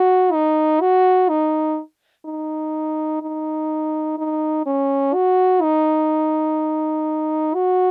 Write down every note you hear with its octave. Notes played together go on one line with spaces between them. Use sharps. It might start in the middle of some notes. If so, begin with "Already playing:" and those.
Already playing: F#4
D#4
F#4
D#4
D#4
D#4
D#4
C#4
F#4
D#4
F#4